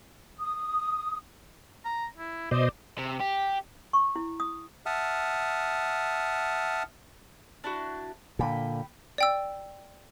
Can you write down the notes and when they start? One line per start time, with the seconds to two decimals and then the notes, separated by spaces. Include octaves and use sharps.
0.37 D#6
1.85 A#5
2.18 E4
2.51 B2 C5 D5 D#5
2.98 C3
3.21 G4
3.93 C#6
4.16 E4
4.40 D#6
4.86 E5 F#5 A5 D#6 F6
7.64 D4 E4 F#4
8.39 A#2 D3 G5 B5
9.18 D5 G5 E6